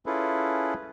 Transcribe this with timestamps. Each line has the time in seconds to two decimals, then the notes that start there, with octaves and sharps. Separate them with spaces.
0.06 C#4 E4 F4 G#4 A4 B4